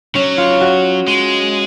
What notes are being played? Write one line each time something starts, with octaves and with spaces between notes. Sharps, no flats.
F#3 C#4
F4
F#4
G#3